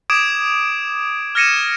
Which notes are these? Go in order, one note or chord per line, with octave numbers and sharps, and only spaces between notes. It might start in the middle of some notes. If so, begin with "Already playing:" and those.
D6 D#6 G#6 D7 E7
F6 G#6 A#6 C#7 D#7 E7